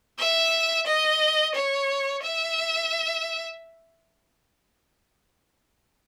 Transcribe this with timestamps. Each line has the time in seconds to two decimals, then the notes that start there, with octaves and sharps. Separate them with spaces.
0.19 E5
0.86 D#5
1.54 C#5
2.23 E5